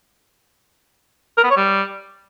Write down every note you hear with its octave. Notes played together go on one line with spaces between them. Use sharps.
A#4
B3
C#5
G3